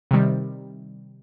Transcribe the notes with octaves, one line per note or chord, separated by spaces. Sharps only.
C3 D#3 G3